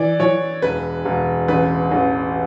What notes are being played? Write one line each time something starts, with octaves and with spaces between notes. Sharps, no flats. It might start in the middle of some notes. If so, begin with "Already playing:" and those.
Already playing: E3 D5
E3 C#5
E1 B4
E1
A1 B4
A1